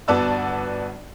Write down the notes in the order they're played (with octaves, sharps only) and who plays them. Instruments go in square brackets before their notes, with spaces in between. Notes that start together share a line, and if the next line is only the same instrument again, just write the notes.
[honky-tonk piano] G1 B3 F#4 D5 A5 E6